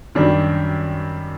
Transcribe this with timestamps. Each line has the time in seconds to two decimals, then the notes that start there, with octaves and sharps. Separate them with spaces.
0.15 F#2 D#3 G3 D4